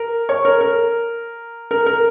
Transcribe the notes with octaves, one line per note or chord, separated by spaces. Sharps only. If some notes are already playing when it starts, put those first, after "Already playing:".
Already playing: A#4
C#5
A#4
A#4
A#4
A#4